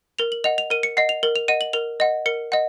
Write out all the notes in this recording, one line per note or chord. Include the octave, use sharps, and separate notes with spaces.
A#4 F7
F#7
D#5 F#5 F7
F7
A#4 D#7
C#7
D#5 F#5 C7
F7
A#4 F#7
F7
D#5 F#5 D#7
F#7
A#4 F7
D#5 F#5
A#4 C#7
D#5 F#5